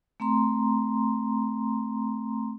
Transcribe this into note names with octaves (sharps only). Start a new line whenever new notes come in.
A3 C4 A#5 C6